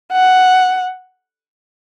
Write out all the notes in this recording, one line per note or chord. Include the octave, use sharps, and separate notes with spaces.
F#5